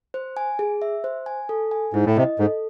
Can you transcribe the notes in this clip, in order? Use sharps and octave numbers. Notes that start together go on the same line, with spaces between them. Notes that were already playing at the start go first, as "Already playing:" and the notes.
C5
G#5
G#4
E5
C5
G#5
A4
G#5
G#2 E4
A2
C3 D#5
G#2 A4